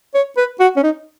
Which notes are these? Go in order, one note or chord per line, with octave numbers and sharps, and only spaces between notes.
C#5
B4
F#4
C#4
D#4